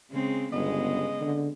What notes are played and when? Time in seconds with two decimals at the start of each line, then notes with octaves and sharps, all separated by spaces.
0.11 C#3 G#3 C4
0.53 G1 C#3 G#3 B3 D#5
1.21 D3